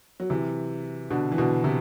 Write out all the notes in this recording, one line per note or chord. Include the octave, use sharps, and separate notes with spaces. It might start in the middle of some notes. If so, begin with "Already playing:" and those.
F#3
C3 E3
B2 D3
E3
B2 D3
C3 E3